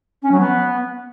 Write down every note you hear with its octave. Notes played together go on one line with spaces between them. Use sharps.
C#4
F#3
B3